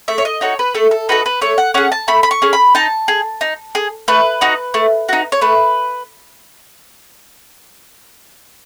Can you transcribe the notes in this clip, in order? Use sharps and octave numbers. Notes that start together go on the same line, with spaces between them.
A3 E5
C#5
D#5
D#4 F#4 A4 C#5
B4
A3 A4
A4
D#4 F#4 A4 B4
B4
A3 C#5
F#5
C#4 G#4 F#5
A5
A3 B5
B5
C#6
C#4 G#4
B5
D#4 A5
G#4
D#4
G#4
A3 B4
D#4 F#4
A3
D#4 F#4
C#5
A3 B4